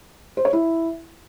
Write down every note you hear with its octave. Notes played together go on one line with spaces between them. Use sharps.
C5
C#5
E4